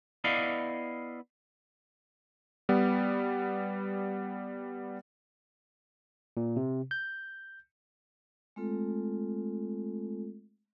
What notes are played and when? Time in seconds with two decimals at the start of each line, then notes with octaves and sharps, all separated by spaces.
0.24 B3 E4 D5 D#5 F5
2.69 G3 B3
6.37 A#2
6.56 C3
6.91 G6
8.56 G#3 A3 C4 F4 A4